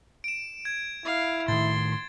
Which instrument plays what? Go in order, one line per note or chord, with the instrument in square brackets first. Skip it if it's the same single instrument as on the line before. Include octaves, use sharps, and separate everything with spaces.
[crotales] D7 E7
G#6
[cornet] E4 [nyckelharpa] F5
[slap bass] A2 D#3 [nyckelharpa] C6 [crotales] A6